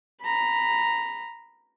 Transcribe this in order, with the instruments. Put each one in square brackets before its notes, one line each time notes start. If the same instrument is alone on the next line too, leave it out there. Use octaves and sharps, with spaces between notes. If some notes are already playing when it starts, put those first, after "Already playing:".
[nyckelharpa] A#5 B5